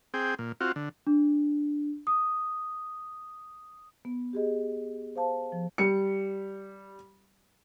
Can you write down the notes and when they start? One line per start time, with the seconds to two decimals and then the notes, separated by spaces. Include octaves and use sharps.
0.14 C4 G#4 G5
0.39 A#2
0.61 C4 F4 F#4
0.76 D3
1.07 D4
2.07 D#6
4.05 B3
4.33 G4 G#4 D#5
5.16 C5 F5 A5
5.52 F3
5.78 G3 C#7